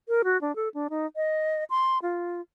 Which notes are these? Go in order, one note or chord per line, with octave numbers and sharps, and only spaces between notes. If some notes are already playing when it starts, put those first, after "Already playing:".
A#4
F#4
D4
A4
D4
D#4
D#5
C6
F4